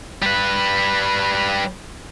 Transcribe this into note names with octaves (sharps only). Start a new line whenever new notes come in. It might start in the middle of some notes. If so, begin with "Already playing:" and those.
G3 B4